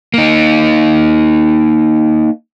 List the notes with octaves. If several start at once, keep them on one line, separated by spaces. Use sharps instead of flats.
A#3 D#4